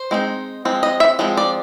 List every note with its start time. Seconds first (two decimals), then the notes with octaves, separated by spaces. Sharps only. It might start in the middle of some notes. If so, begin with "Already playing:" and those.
Already playing: C5
0.11 G#3 C4 D#4
0.65 F3 G#3 C4
0.83 D#5
1.00 E5
1.19 F3 G#3 C4
1.37 D5